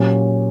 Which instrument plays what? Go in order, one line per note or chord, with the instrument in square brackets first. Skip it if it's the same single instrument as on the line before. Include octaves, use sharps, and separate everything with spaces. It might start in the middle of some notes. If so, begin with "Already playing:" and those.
Already playing: [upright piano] A#2 F#3 C#4 G4